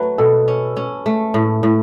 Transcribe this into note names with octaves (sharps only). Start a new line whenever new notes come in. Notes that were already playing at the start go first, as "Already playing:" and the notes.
Already playing: F#3 A3 B4
B2 A4
C#4
C#4
A3
A2
A2